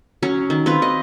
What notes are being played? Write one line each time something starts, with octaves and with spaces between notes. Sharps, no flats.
F#3 C#4
D#3
C4 F4 B4
D#5